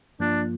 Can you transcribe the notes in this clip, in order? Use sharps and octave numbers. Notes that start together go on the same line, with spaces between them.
G2 F3 A#3 D4 F4